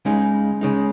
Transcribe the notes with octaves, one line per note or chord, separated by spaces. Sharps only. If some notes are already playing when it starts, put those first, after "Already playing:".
C#2 C#3 G#3 D#4
C#2 C#3 G#3 D#4